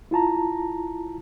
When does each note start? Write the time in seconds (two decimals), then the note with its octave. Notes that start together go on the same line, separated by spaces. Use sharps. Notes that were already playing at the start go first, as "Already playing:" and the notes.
0.11 E4 F4 A5 A#5